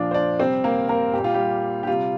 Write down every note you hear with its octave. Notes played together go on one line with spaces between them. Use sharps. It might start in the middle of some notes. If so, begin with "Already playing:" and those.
Already playing: A#2 F3 D4 F4 D5
C5
D4 D5
C3 G3 C4 C5
A#3 A#4
A#3 A#4
A#2 G3 G4
F4
G3 G4
G4
C3 G3 F4